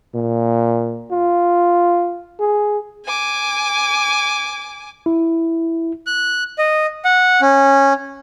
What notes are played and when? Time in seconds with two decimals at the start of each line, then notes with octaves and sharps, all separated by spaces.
0.15 A#2
1.11 F4
2.39 G#4
3.05 G#5 D6
5.06 E4
6.06 F#6
6.58 D#5
7.05 F#5
7.42 C#4